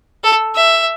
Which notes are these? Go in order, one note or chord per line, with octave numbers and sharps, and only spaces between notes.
A4
E5